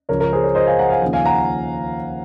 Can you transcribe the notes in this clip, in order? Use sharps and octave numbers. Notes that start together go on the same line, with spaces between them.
C#2 C#3 F3 A#4 C#5
A#4
G#4 C5
A#4 C#5
C5 D#5
F5 G#5
F#5 A#5
F5 G#5
D#2 C#3 F3
F5 G#5
F#5 A#5